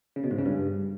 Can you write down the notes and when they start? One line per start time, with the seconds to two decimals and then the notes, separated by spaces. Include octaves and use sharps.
0.16 C#3
0.24 B2
0.31 G#2
0.38 C#3
0.46 G2